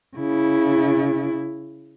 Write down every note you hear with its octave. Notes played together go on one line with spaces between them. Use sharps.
C#3 E4